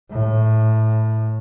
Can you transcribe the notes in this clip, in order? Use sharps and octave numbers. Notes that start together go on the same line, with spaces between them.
A2